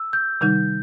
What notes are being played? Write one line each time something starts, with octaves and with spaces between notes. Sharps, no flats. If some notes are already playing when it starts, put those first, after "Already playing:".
Already playing: E6
G6
C3 D#3 G3 D#4 G6